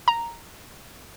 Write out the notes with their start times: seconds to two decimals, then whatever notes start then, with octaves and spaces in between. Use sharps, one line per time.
0.08 A#5